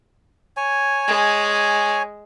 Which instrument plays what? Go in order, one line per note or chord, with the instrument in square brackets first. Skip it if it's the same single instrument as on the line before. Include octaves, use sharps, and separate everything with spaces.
[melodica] C#5 G#5
[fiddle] G#3